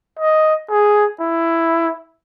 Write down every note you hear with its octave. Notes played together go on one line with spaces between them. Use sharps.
D#5
G#4
E4